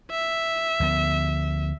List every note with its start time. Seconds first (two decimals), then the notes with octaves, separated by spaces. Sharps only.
0.11 E5
0.80 D2 F3 B3